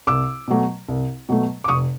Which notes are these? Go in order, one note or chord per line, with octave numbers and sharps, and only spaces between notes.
C2 D6 E6
B2 F#3 A3
C2
B2 F#3 A3
D6
F1 C#6 D#6